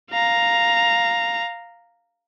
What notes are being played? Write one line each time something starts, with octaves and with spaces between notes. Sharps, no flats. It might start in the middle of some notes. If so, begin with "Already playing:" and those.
F5 A#5